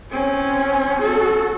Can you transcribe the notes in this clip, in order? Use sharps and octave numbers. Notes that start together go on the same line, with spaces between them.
C4 C#4
F#4 A4